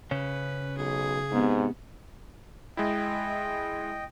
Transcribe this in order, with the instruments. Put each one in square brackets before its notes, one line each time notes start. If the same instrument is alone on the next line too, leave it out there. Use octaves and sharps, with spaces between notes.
[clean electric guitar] C#3 C#4 [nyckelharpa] B4
[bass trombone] B1 [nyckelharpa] G#4
[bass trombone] G#2 [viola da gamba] C3 B3
[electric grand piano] G#3 E4 [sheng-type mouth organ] D#5 G5